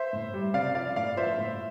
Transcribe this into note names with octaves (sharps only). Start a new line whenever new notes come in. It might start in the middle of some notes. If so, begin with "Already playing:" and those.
Already playing: C5 E5
A2
G3
C3 D5 F5
F3 D5 F5
A2 D5 F5
F3 C5 E5
A2